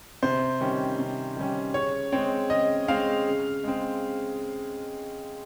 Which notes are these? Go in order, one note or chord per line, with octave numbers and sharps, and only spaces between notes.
C3 C5
D#3 G3 C#4
C3
D#3 G3 C#4
C#3 C#5
G#3 C4 C#5
C#3 D#5
G#3 C4 F5
C#3
G#3 C4